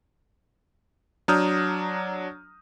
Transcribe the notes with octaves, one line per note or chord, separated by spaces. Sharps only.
F#3 D4 A#5 D#6 F6 G6